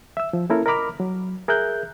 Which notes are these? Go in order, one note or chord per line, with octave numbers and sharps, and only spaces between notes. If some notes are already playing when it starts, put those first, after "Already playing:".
E5 E6
F3
A#3 C#4 E4 A4 A#4
A#4 D#5 A#5 B5 D6 F6
F#3
G#4 A#4 E5 F#6 G6